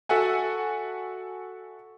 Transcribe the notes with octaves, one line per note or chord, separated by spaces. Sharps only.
F#4 A4 E5 F#5 G#5